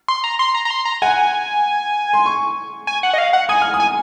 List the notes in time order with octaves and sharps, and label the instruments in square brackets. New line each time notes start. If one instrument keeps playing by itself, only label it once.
[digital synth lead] C6
A#5
C6
A#5
A#5
C6
A#5
[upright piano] F#5 [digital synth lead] G#5
[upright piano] C6
C#6
[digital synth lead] G#5
F#5
D#5
F5
F#5
[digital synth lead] G#5 [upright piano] D#6
[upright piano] F6
D#6
[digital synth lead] G#5